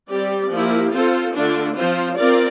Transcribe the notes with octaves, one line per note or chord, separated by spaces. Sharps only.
G3 C4 G4 D5
F3 A#3 E4 G4
C4 F4 A4 C5
D3 A3 D4 F4
F3 C4 F4 C5
C4 F4 A#4 D5